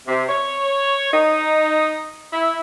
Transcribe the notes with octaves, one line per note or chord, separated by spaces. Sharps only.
C3
C#5
D#4
E4